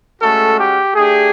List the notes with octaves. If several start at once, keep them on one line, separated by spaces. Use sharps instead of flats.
G#3 A3 C#4 F#4 A4
G4
A3 D4 G4 G#4